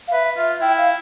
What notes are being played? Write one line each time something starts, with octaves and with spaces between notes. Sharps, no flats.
F5
B4 E5
F4 E5
E4 G5
F5